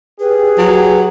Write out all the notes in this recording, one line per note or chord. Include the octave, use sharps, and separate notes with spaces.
G4 G#4 B4
F#3